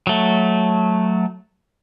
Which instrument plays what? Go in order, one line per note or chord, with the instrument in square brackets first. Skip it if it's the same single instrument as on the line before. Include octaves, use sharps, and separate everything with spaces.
[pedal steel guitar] F#3 A3